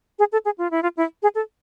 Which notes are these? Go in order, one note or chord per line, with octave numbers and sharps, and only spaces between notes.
G#4
A4
G#4
F4
E4
F4
E4
G#4
A4